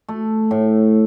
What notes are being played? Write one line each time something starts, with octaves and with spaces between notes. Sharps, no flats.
A3
A2